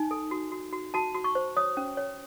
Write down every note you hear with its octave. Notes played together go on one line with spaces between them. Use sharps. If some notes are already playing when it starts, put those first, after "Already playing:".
Already playing: D#4 G#5
A4
F#4
F#4
F#4
F#4 A5
F#4
C#6
C5
C#5 D#6
C#4
C#5